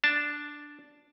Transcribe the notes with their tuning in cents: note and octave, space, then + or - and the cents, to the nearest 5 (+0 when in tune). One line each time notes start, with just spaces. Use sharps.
D4 +0 A5 +0